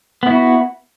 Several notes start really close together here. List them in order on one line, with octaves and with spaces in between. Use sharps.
B3 E4 F#4